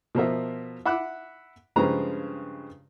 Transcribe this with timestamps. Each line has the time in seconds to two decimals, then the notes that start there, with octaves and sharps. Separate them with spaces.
0.15 B2 F3 A#4 E5
0.85 E5 F#5 B5 D6 E6 F#6
1.76 G2 C#3 F3 G#3 B4 A#5